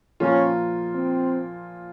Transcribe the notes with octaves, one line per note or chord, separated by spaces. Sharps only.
A#2 F3 A#3 C#4 F4
C4